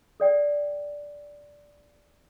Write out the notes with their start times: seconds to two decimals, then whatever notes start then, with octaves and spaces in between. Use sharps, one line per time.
0.20 A4 D5 G5